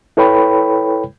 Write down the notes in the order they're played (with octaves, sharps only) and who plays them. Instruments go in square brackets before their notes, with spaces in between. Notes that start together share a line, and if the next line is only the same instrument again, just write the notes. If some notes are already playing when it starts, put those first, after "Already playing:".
[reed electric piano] E4 A4 B4 C#5 G5 B5